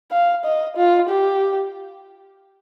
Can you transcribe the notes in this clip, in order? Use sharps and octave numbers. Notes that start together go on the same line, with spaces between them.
F5
D#5
F4
G4